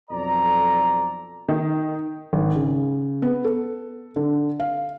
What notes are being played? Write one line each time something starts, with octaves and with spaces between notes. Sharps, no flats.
B1 F2 A4 D5 A#5
D#3
G#1
C#3
B3
A4
D3
F5